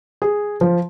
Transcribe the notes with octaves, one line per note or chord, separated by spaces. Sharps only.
G#4
F3